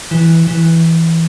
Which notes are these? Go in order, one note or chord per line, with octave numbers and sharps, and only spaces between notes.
E3
E3